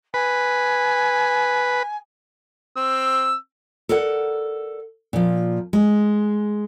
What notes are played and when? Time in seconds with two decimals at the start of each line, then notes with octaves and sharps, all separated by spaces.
0.14 B4 G#5
2.76 C4 E6
3.89 A4 A#4 D5 F#5
5.13 A#2 F3
5.73 G#3